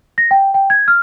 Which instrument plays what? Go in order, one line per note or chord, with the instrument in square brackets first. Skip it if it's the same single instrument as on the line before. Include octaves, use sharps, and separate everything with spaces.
[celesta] A#6
G5
G5
G#6
F6